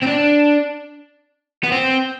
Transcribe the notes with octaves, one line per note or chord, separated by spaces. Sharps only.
C4
D4
B3
C4